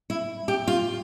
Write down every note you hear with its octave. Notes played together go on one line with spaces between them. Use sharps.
E4
G4
F4